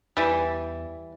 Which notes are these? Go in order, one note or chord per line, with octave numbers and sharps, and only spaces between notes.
E2 E3 G3